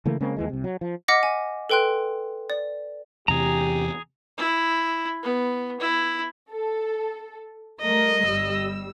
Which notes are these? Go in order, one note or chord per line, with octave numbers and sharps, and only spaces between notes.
C#3 E3 A3 A#3
C#3 G#3 A#3 C4
D#2 E3 G#3
C2 C3
F#3
F3
D#5 F#5 D6 F6 A#6 B6
G#5
A4 B4 G5 C6 F#6
D5
E2 C3 E3 G4 G#4 A#5
E4
B3
E4
A4
G3 A3 A#4 D#5
G1 G3 E6